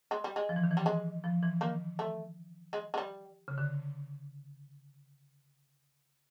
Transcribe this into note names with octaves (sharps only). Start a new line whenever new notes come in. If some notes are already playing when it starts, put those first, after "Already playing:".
G#3
G3
G#3
F3
E3
D#3
E3
G3
G#3
F3
E3
D#3 A#3
A3
G#3
G#3
G3
C#3
D3